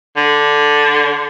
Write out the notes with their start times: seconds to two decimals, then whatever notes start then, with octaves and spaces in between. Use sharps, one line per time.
0.17 D3